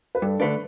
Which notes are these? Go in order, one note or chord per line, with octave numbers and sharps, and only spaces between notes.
B4
G2 A4
D3 A3 D4 B4